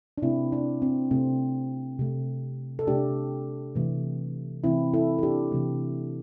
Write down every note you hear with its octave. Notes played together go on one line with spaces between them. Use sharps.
D4
C3 A3 C4 E4
D4
C4
C3 A3 C4
C3 A3
A4
C3 A3 D4 G4
C3 E3 A3
C3 E3 A3 C4 E4
E4 A4
A4
D4 G4
C3 E3 A3